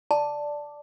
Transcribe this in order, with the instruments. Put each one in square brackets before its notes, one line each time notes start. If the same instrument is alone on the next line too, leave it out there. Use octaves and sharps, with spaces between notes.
[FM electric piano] D5 [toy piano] A5